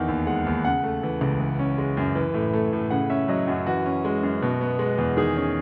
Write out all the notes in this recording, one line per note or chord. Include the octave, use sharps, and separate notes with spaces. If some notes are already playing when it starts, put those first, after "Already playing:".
Already playing: E2 D#3 F#5
D#2
G#3 F#5
D#2
C#3 F#5
A3
E3
C#2
E3
C#4
G#3
F#2
E3
A2
A3
A2
C#3 F#5
C#4 E5
F#3 D#5
F#2 F#4
E3 F#4
C#4
G#3
F#2
B2
B3
G#3
E2
D#3 G#4
C#4